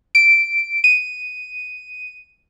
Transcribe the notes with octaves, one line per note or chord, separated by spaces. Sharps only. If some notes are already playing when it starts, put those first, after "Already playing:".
D7
D#7